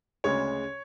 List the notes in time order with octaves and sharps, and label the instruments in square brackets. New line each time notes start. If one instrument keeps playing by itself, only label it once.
[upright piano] D2 C#3 G#3 [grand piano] C#5